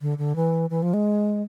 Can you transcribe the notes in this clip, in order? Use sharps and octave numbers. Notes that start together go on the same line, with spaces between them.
D3
D3
E3
E3
F3
G#3